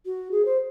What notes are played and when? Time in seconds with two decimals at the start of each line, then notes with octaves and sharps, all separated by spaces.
0.05 F#4
0.31 G#4
0.45 C5